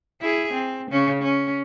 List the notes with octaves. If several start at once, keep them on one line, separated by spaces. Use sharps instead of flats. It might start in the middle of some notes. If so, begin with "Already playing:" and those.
E4 G#4
C4
C#3 C#4
C#4